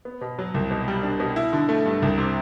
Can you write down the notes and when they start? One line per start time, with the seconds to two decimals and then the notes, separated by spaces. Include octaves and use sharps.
0.05 B3
0.21 B2
0.39 F#3
0.54 C2
0.71 B2
0.88 G3
1.03 D4
1.20 B2
1.36 E4
1.53 D3
1.69 A3
1.86 G2
2.02 C2
2.18 C3